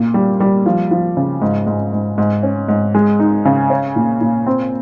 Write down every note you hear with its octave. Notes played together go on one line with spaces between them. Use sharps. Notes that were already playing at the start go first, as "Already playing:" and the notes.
Already playing: A#2
G3
G3
F3
F3
C#3
G#2
G#2
G#2
G#2
C#4
G#2
G#3
D#4
C#3
C#4
A#2
A#2
C4